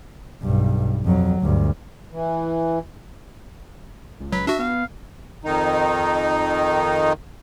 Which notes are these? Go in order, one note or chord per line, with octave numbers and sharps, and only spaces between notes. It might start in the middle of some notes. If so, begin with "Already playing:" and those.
B1 G2
F2 F#3
D2 G2
E3
C#2
F#3 B4
D4 F#4 E5
B3 F5
F2 D#3 D#4